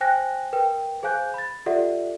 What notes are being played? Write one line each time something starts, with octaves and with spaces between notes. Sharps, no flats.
C5 G5 G#5 F#6 A#6
A#4 B4 G5
G#4 C5 F5 G#5 F#6 G6
B5 A6
F4 G4 A4 D5 E5 F#5